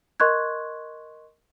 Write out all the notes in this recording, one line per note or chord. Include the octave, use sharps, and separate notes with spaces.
A#4 D#5 C6 C#6 F#6 G#6